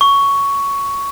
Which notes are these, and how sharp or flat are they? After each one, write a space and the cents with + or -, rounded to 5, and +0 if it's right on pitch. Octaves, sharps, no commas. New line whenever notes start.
C#6 +10